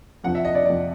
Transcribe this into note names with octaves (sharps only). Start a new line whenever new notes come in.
F2 C3 F3 F#5
E5
D#5
D5
F2 C3 F3 D5